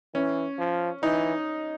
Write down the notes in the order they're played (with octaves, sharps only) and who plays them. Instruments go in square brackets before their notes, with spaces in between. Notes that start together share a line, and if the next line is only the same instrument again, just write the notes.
[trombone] E3 [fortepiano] C#4
[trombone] F3
[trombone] E3 [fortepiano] D#4